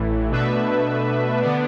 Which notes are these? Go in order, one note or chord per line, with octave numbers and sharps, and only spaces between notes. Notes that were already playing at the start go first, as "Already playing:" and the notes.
Already playing: A1 A2 E3 A3 E4
B2 A3 D4 B4 E5
D3 B3 D4